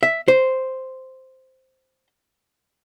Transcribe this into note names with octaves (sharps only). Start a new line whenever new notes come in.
E5
C5